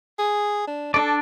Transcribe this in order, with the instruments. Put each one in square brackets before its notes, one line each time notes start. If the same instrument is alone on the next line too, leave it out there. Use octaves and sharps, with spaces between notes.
[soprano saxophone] G#4
D4
[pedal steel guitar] D4 D5 [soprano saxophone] A4